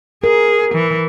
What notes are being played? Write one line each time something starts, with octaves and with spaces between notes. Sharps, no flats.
G#4 A#4
E3